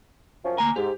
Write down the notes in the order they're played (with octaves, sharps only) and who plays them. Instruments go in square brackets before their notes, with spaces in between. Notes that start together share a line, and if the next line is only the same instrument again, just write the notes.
[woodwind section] F#2 F3 C#4
[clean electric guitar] D2 A#3 G#5 [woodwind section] A#5
[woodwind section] G#2 [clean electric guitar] G4